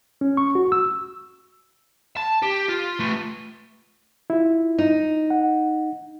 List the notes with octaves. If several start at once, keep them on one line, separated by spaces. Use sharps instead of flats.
C#4
C#6
F#4
E6
A5
G4
F4
A3 B4
E4 F4
D#4
F#5